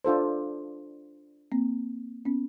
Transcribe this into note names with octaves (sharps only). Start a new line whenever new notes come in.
D4 F4 A4 C5
A#3 C4
B3 C#4